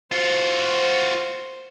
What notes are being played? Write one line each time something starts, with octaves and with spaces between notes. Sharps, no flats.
F4 F#4 C5